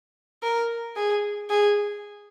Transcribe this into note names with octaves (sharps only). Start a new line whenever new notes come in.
A#4
G#4
G#4